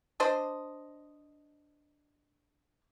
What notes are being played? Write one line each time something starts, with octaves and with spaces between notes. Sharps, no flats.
D4 C5 D#5